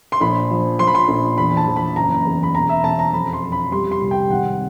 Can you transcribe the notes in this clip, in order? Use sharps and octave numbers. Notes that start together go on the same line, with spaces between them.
C6
A#1 B5
F3
F3 C6
B5
C6
A#1
E2 B5
A5
E2
B5
F#1 A#5
E2
B5
E1 A#5
E5
E1 A5
A#5
F2 B5
C6
F2
B5
G3 C6
C6
C2
G5
G#1 F#5